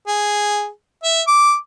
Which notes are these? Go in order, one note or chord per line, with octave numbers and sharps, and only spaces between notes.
G#4
E5
D6